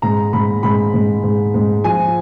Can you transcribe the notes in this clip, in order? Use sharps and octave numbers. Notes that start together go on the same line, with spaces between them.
G#2 A#5
G#2 B5
G#2 B5
G#2
G#2
G#2
F3 G#5